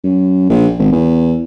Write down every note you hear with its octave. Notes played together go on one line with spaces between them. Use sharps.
F#2
A#1
G#1
E2